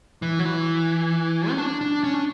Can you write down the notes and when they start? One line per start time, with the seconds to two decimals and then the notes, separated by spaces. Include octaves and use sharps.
0.22 E3
0.39 F#3
0.45 E3
1.50 C#4
1.58 D4
1.81 D4
2.04 C#4
2.14 D4